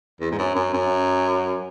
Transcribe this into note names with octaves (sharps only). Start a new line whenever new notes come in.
E2
G#2
F#2
F#2
F#2